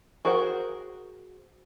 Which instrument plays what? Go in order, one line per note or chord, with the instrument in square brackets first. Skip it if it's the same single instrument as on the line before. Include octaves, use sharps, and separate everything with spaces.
[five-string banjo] F#4 G#4 A#4 C5 F#5